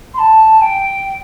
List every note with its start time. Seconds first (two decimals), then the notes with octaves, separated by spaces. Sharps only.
0.14 C6
0.19 A5
0.62 G5